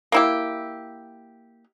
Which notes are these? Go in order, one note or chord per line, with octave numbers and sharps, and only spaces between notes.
A#3 E4 G4